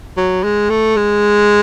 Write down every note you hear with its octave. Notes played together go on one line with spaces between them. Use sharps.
F#3
G#3
A3
G#3